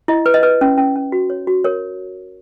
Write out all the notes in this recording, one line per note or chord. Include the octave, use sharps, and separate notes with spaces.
E4 D#5
B4
D#5
B4
C#4
C#4
C#4
F#4
C#5
F#4
A#4 C#5